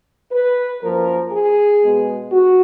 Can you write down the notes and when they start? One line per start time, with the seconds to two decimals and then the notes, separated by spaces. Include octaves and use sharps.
0.32 B4
0.82 F#2 F3 A#3 A#4
1.32 G#4
1.82 B2 G#3 B3
2.32 F#4